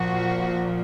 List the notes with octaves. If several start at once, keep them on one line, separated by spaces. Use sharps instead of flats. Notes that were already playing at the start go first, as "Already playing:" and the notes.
Already playing: A#2 F3 F#4